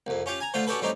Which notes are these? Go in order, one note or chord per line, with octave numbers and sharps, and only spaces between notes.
C2 F2
C#4 F4 G4 F5
G#5 A#5
D3 A3 F4 C5
C#4 D4 F#4 G4 A4 B4
A2 G3 C4 C#4 D#4 G4